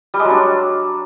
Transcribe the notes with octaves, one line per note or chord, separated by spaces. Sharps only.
G3
G#3
F#3
D4